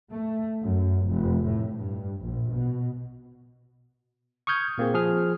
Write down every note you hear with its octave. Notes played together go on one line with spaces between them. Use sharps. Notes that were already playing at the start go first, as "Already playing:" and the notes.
A3
F#2
F1
A2
G2
A#1
B2
C#6 D#6 F6 G6 G#6
A#2 A#3 C4 G#4
F3 G#4 F6